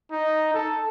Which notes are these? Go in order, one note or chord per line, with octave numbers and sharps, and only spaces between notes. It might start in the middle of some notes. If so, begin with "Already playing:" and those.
D#4
A4